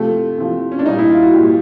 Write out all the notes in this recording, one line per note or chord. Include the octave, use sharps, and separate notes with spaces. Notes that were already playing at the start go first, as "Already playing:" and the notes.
Already playing: C3 F3 A3
C3 F3
C#4
D4
A#2 G3 D#4
E4
F4
F#4
A#2 G3 G4